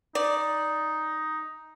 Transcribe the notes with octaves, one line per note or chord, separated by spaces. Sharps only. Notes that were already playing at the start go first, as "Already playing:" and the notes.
D#4 D5